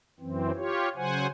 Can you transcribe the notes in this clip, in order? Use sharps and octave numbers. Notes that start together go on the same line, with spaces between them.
F#2 E3 C4
F4 G4 C#5
C#3 F#3 C5 F#5 G#5